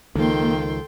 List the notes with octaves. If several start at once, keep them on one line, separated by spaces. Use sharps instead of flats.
C#2 D#3 F3 A#3 A4 G5 C6